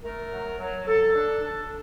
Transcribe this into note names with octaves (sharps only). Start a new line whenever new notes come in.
A3 A#4
F#3
F#3
F#3 A4
D4
D4